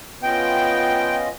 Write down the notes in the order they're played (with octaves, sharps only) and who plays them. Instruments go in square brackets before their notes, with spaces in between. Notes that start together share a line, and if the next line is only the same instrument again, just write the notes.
[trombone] B3 [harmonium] C#4 F4 D#5 [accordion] G5